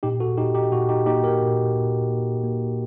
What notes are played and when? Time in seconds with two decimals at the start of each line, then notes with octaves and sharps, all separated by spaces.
0.03 A#2 D#4 G4
0.20 F#4 A4
0.37 A#2 D#4 G4
0.55 D#4 G4
0.72 A#2 F#4
0.89 D#4 G4
1.06 A#3 D#4 G4
1.24 G4 A#4
1.41 A#2
1.75 A#2
2.09 A#3
2.44 A#3